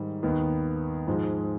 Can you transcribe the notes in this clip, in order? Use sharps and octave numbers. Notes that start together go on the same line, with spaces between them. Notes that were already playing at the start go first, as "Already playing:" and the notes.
Already playing: G#2 D#3 G3
D#2 D#3 B3
G#2 F3 G#3